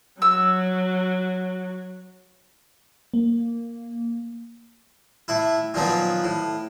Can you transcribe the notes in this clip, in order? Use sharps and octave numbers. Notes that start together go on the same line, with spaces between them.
F#3 E6
A#3
A2 E4
A#2 D#3 F3 F#3 B3
A2